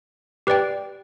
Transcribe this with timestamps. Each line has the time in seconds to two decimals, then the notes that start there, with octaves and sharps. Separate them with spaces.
0.47 G4 B4 D5 G5